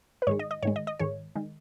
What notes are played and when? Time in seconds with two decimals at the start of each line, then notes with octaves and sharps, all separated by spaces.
0.22 B4
0.27 G#2 D#3 G#3 C#5
0.39 D#5
0.51 D#5
0.62 G#2 D#3 G#3 C#5
0.76 D#5
0.87 D#5
0.99 G#2 D#3 G#3 C#5
1.36 D#3 G#3